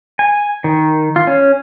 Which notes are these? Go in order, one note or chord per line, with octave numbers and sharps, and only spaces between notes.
G#5
D#3
F4
C#4